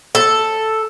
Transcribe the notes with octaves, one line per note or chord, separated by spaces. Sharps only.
A4